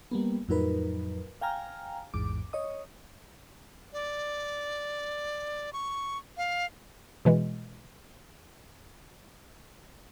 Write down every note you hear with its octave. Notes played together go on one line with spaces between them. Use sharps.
G3 A#3 B3
F2 A2 F#3 D#4 A#4 B4
F5 G5 G#5 A#5 F6
A1 E2 G#2 D6
C#5 D#5 D#6
D5
C#6
F5
B2 E3 G#3